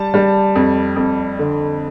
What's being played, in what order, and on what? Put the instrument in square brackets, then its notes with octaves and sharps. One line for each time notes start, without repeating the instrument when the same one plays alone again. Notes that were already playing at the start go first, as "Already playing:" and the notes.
Already playing: [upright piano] G3 A5
G3
F2
F2
D3